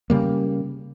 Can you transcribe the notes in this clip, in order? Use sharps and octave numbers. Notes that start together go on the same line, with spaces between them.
C#3 G3 A#3